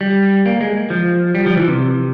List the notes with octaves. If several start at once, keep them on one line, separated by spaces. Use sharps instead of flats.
G3
A#3
G#3
F3
G3
F3
E3
C3